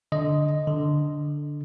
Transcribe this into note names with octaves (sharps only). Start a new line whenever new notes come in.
D3 D#5
D3